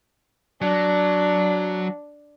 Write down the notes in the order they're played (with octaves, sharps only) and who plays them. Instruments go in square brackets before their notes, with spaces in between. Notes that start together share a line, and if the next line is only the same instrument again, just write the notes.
[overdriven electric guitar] F#3 [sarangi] D4